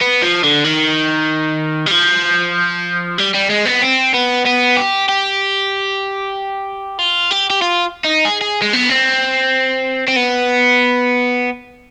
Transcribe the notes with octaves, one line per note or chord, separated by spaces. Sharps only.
B3
F3
D3
D#3
G3
F3
G3
G3
G#3
B3
C4
B3
B3
G4
G4
F4
G4
G4
F4
D#4
G#4
G#4
G#3
B3
C4
C4
B3